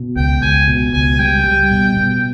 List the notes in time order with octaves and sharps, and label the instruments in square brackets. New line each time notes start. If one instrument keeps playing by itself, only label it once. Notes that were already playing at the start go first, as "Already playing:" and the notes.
Already playing: [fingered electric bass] B2
[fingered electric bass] C#2 [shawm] G5
[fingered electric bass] C#2 [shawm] G#5
[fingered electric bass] B2
[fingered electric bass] C#2 [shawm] G#5
[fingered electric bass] G3 [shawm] G5
[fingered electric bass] G3
B2
B2